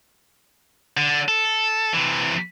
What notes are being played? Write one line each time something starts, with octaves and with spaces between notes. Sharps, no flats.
D3
A4
C3 E3